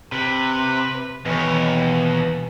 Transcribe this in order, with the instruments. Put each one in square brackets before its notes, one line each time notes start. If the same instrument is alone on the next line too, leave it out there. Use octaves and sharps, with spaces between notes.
[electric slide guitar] C3 [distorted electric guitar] B4
[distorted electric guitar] D#2 [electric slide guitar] B2 C#5 [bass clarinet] E3